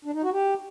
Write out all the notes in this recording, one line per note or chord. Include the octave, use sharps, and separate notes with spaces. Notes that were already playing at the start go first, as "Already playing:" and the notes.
D4
D#4
F#4
G4